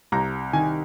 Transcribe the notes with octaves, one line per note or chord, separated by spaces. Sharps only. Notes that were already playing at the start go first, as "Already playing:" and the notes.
C2 A#5
D#3 G#5